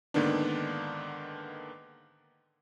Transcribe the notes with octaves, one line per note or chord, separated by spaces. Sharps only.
G#2 D3 D#3 A#3 B3 D4